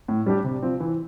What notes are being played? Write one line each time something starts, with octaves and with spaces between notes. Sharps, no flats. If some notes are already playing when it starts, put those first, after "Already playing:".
A2
G3 D4 G4
C3
F3 C4
E3